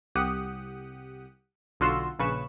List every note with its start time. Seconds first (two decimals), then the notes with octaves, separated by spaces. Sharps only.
0.15 C2 G4 F#5 D#6
1.80 B1 D3 F4 F#4 C6 E6
2.19 A#1 C#3 B4 C#6 E7